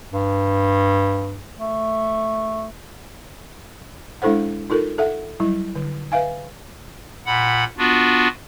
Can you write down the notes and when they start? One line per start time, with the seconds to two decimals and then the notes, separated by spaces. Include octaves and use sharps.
0.14 G2
1.59 A3
4.22 G#3 D4 E4 A4 C5 F#5
4.70 D#4 F4 A4 A#4
4.98 A4 E5 F#5
5.40 F#3 G3 E4
5.75 D3
6.12 B4 E5 F5 G#5
7.26 A#2 F#5 B5
7.78 B3 D4 F4 F#4